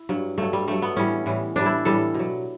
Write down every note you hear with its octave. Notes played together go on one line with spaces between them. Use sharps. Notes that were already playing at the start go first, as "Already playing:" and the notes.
Already playing: E4
G2 F#3
G2 F#3 A3
G3
G2 F#3 A3
B3
A2 E3 G3 C#4
A2 E3 G3
A2 E3 G3 D4
E4
A2 E3 G3 A4
B2 F#3